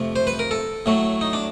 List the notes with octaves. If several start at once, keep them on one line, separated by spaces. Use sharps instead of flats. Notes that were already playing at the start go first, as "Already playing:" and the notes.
Already playing: F2 C3 F3 A3
C5
B4
A#4
A4
A2 F#3 A3
D#4
D4